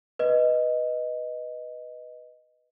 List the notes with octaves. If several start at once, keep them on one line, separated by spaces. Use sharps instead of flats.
B4 D#5